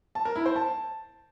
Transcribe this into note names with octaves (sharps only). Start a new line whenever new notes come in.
A5
A#4
E4
C5
A5